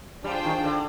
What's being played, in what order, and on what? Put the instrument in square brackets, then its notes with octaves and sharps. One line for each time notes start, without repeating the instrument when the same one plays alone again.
[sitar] G3 [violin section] D4 F4 G#4 C5 G5
[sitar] D#3
D3